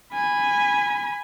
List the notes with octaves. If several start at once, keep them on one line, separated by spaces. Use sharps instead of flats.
G#5 B5